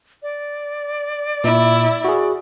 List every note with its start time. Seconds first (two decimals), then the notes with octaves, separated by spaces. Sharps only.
0.23 D5
1.44 A#2 E4
2.05 F#4 G#4